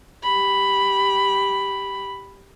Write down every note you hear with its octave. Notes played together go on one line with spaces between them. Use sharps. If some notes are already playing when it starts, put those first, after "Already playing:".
G4 B5